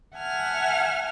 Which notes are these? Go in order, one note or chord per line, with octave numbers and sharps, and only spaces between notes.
E5 F#5 G#5 A5 F6